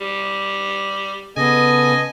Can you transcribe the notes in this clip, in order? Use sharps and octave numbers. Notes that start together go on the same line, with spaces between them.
G3
C#3 B3 A4 D#5 G#5